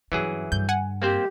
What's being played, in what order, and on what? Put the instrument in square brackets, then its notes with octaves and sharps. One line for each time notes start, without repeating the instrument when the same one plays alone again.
[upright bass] G2 C#4 [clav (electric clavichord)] E3 F#3 G#4
[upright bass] G2 D3 [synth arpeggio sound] G6
[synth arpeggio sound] F#5 G#5
[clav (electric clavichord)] A#3 C4 C5 [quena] G4